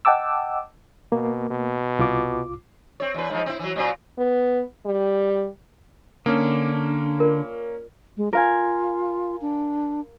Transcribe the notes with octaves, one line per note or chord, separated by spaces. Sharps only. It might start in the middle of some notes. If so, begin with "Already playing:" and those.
D#5 F#5 G5 A5 D6 E6
B2 A#3
B2
C2 F4 D6
C4 C#5
E2 B4
G#2 F3
C4 E4
E3 F#3
A#2 F#3 C4
B3
G3
D3 A#3 C#4 D4 D#6
F4 A#4 D5
G#3
F4 A#4 F5 G#5
D4